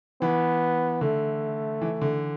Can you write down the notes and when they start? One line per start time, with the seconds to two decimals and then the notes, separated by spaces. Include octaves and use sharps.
0.21 E3 B3
1.01 D3 A3
1.81 E3
2.01 D3